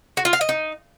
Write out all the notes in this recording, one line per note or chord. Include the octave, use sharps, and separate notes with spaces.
F#4
F4
F5
D#5
D#4